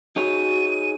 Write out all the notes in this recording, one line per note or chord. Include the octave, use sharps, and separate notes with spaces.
D#4 F#4 G#4 C#5 D#7